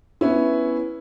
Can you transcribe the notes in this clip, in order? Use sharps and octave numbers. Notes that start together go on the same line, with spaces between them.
B3 C#4 E4